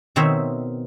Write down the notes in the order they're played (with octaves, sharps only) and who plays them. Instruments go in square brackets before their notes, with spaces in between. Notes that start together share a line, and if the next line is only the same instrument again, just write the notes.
[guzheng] B2 D#3 C4 C5 C#5 E5